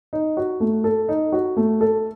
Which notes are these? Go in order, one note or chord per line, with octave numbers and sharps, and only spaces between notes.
D#4
F#4
A3
A4
D#4
F#4
A3
A4